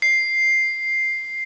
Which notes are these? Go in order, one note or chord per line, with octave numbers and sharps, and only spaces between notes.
C7